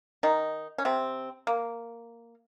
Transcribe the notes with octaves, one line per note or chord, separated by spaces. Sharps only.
D#3 D#4
C#4
C3 C4
A#3